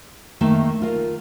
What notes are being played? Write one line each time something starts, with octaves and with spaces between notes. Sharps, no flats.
D#3 A3 A#3 E5
F4 A#4